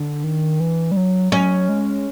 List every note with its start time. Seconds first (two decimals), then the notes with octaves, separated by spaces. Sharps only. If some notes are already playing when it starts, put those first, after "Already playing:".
Already playing: D3 D4
0.24 D#3
0.60 E3
0.92 G3
0.97 F#3
1.32 F#3 C#4
1.69 G#3